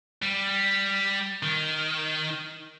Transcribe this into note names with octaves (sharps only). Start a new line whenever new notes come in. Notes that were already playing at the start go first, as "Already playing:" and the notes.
G3
D#3